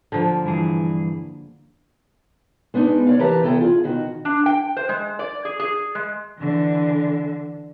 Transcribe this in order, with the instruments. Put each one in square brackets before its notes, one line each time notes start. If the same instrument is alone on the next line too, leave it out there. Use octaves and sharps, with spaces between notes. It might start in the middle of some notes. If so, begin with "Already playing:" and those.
[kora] D3 F3 A#3
[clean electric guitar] G2 E3 G#4
[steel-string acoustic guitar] G#3 B3 D4 D#4
C#5 D5 F5
E3 G4 A#4 B4 A5 A#5
E2 E3 G3 G#4 A4 G5
F4 G#4
B2 D#3 F#4
[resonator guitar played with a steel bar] D4
G5
C5
G#3
D5
G#4
G#4
G#3
[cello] D3 E3